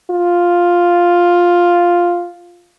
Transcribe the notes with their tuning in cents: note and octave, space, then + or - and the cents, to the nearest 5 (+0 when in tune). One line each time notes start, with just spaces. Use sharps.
F4 +5